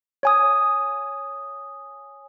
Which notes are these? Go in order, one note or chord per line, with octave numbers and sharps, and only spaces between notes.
C#5 G#5 D#6